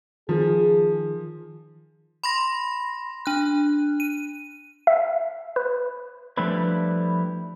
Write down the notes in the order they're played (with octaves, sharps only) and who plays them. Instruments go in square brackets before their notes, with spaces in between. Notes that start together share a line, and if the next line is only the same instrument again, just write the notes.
[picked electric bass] D#3 [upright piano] F3 [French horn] G#4
[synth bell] B5 C6 A#6
D4 F#6
D#7
[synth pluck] E5
B4
[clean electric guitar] F3 G3 A3 D4 E4 B4